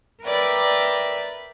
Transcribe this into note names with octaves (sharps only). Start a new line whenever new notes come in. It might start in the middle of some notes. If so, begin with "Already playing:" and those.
A#4 B4 D5 E5 G5